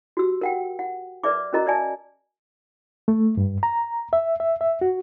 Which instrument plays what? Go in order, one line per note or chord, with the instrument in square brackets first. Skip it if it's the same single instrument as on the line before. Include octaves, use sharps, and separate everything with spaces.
[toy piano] F#4 G4 E6
A#4 F#5 G5
F#5
A#4 B4 D5 E5 D6
C#4 F#4 A#4 D#5 A#5
A#4 D5 E5 G#5 A5
[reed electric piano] A3
G2
A#5
E5
E5
E5
F#4